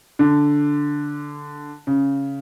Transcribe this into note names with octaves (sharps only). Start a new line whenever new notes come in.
D3
C#3